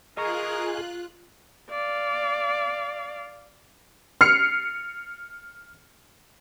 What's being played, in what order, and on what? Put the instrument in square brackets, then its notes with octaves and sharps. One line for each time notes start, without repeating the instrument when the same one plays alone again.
[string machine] F4 F#6 [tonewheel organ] G#4 [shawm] A#4 [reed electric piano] D#5 A#5 C#6
[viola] D5 F5
[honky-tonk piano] F6 C7 C#7